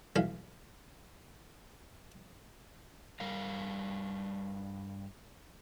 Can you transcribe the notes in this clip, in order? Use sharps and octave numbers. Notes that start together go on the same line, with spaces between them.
B1 E3 F5
G2 G3 A#4 F5